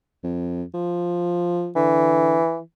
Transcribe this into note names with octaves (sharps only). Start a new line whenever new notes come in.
F2
F3
D3 E3